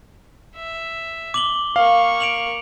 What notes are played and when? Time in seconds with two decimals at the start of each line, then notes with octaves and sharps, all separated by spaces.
0.56 E5
1.34 D6 F#7 G7
1.76 A#3 F5 C#6
2.20 D7 F7 F#7